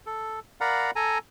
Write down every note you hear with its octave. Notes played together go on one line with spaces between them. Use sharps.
A4
A#4 D5 F5 F#5 A#5 B5
A4 G#5 A#5